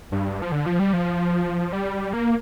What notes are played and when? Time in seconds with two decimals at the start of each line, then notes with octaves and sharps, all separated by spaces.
0.12 G2
0.42 F3
0.52 D3
0.66 F3
0.79 G3
0.93 F3
1.73 G3
2.13 A#3